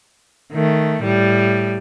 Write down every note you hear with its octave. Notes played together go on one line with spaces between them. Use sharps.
D#3 A3
A2 G3